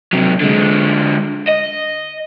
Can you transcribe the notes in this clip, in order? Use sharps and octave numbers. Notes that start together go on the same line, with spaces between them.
C3 F#3
D3 G#3
D#5